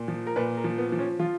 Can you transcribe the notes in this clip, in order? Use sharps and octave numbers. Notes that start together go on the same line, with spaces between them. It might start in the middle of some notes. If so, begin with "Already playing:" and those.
Already playing: A#2
F3
A#4
A#2 B4
A#4
F3
B3
F3
C#4
F3 F4